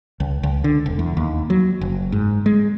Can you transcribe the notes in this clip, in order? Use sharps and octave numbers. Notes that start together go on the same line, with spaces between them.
C#2
C#2
D3
E1
E2
D#2
F#3
F#1
G#2
G#3